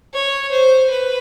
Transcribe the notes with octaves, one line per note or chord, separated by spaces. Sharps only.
C#5
C5
B4